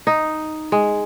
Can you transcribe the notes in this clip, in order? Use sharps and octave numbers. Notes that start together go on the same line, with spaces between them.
D#4
G#3